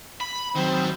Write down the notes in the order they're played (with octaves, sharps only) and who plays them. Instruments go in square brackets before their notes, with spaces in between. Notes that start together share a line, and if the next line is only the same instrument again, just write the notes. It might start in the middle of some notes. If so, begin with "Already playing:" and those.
[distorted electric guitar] B5
[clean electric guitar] D#3 F#3 [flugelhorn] C4 [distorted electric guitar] D#4 C5